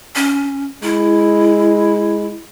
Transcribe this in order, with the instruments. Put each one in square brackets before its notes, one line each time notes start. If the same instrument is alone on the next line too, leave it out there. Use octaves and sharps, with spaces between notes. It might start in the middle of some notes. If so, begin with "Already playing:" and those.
[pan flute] C#4
[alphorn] G#3 [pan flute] E4